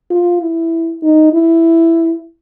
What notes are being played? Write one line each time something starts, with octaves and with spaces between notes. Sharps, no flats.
F4
E4
D#4
E4